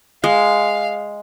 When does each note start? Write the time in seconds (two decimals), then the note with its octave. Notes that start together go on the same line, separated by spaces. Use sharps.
0.24 G#3 F5